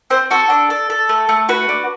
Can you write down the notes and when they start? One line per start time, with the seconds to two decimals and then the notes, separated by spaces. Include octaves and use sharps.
0.10 C4 C5
0.31 F#4 A4
0.50 D4
0.70 A4
0.90 A4
1.09 A3
1.29 A3
1.49 F#4 B4
1.69 D4